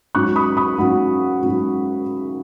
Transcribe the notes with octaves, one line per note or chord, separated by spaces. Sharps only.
G#2 F#3 C#4 C#6 F#6
B5 D#6
B5 D#6
G#2 F#3 C#4 F#5 B5
G#2 F#3 C#4